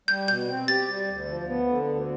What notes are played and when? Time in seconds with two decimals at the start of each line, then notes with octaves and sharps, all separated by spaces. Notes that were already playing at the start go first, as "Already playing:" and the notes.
0.08 G3 G6
0.28 B2 G6
0.48 C4
0.68 G4 A6
0.88 G3
1.08 D2
1.28 F3
1.48 B3
1.67 D3
1.87 D2